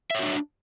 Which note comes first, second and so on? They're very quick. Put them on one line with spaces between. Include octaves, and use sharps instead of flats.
E5 C#5 F#4 D4